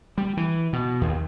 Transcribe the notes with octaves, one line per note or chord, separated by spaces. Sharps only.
G3
E3
B2
D#2